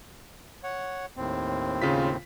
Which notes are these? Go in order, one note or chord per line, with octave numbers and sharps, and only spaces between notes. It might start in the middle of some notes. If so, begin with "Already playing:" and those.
C#5 F#5
D#2 A2 C4
C#3 F4 B6